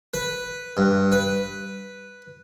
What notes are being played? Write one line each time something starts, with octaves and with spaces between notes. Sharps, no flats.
B4
G2
B4